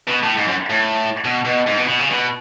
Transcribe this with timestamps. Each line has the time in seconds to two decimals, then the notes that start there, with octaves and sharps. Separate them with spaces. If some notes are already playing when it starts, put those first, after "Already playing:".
0.08 B2
0.23 A2
0.37 G#2
0.47 F#2
0.70 A2
1.24 B2
1.45 B2
1.67 G#2
1.78 B2
1.89 B2
2.00 C#3
2.11 B2